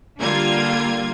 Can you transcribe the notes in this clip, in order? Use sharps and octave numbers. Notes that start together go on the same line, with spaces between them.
D3 G3 A#3 F4 G#6